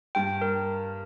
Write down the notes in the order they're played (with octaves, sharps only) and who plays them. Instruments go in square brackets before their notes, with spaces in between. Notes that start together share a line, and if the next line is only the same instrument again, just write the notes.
[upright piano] G2 [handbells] G5
[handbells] A#4